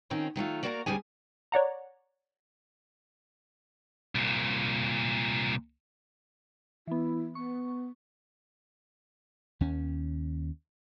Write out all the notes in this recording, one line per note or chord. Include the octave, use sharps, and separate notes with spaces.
D#3 C4 C#4 D#4 F4
D#3 F#3 A3 F4
A#3 F#4 A#4 D5 E5 A#5
D2 E3 G3 C#4 G#4 G#5
C#5 D5 F#5 A#5
C2 A#2
E3 B3 E4
B3 C#6
D#2 C#4